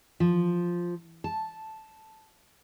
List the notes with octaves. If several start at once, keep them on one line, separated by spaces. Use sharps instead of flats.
F3
A5